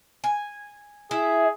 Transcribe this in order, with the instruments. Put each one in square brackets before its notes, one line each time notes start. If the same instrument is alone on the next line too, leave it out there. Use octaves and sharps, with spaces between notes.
[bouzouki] G#5
[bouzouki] E4 E5 [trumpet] G#4